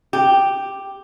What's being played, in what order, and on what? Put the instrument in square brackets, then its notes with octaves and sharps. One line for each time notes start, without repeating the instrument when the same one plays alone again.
[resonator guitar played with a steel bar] G4